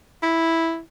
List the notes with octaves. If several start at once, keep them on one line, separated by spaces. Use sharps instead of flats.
E4